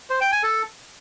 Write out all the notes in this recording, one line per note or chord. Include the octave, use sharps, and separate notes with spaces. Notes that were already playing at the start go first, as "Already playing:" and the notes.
C5
G5
G#5
A4